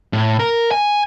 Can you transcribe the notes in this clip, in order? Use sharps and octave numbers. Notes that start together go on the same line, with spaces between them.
A2
A#4
G#5